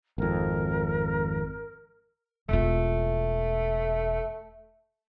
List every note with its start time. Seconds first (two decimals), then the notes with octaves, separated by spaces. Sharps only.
0.18 G#1 F2 A#4
2.49 E1 A3 F4